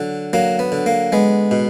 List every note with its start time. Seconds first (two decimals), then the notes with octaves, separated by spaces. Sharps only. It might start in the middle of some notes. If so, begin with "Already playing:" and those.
Already playing: D3 F#3
0.33 F#3 A#3
0.59 B3
0.72 D3
0.86 A#3
1.12 G#3 B3
1.51 B2